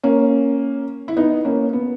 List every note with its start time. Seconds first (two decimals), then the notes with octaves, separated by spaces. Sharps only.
0.03 A#3 C#4
1.08 E4
1.17 B3 D#4
1.45 A#3 C#4
1.73 B3